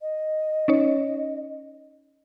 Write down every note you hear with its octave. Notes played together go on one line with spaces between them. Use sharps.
D#5
C#4 D#4 C#5